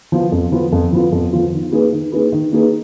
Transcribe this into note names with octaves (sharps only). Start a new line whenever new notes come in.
F3 B3 F4
F2
F3 B3 F4
F2
F3 B3 F4
F2
F3 B3 F4
D#3
A#3 D#4 G#4 B4
D#3
A#3 D#4 G#4 B4
D#3
A#3 D#4 G#4 B4